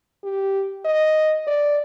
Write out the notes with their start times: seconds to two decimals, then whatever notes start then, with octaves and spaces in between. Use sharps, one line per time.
0.23 G4
0.85 D#5
1.47 D5